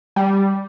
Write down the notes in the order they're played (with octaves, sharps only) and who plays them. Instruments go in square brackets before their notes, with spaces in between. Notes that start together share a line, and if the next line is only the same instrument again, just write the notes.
[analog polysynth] G3